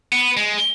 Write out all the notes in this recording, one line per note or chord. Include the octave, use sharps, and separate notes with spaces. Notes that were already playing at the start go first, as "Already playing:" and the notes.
B3
G#3